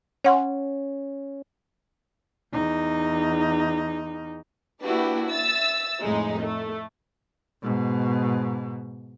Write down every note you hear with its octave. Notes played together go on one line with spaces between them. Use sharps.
C#4 C#5 F#5 C6
E2 D#4
A#3 D4 E4 F#4 G4 B4
E5 E6 A6
F2 A2 G#3 D#4
A3
G#2 B2